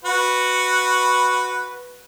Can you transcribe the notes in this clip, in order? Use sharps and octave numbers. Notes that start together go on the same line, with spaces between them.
F#4 B4